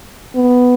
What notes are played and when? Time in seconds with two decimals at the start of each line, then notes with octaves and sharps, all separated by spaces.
0.36 B3